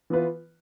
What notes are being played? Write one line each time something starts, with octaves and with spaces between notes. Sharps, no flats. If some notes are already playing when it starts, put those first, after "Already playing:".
E3 B3 F4 B4